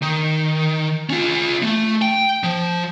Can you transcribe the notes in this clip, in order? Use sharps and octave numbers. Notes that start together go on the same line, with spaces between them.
D#3
C#4 F4
A3
G5
F3